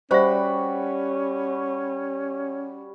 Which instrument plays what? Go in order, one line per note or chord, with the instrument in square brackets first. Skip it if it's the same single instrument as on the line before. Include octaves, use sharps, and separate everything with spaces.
[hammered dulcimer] G3 F#4 B5 [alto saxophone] C#4 [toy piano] C5 E5